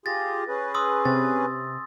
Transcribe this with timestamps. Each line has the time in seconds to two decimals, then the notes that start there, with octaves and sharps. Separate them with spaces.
0.06 F4 G4 G#4 A6 A#6
0.48 C#4 G#4 B4
0.74 C6 D#6 E6
1.05 C3 A6